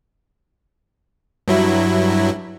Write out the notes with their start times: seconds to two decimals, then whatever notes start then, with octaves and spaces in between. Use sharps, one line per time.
1.48 G2 F#3 E4